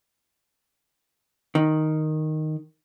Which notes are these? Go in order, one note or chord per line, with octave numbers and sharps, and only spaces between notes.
D#3